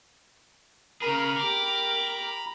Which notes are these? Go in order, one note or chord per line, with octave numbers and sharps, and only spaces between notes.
C#3 G#4 A#4 A#5 B5
G4 A#4 D6